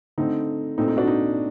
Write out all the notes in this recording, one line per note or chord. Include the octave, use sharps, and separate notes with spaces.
D3 A3 C4 D#4
A#2 A3 C4 D#4
D#4
D4 F#4
D#4